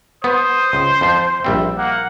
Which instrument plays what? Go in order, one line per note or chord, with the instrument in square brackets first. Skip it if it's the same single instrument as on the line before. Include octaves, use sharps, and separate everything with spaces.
[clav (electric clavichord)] B3 [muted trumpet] C5 [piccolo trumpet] D#6
[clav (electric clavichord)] C#2 [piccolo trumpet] C6
[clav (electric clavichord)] F2 F3
[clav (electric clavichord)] A#1 G3 C4 [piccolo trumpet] E5
[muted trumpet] A#3 [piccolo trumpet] F#5